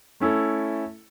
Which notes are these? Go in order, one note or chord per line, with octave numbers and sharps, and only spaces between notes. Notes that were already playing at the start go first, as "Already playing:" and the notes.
A3 C#4 E4 A4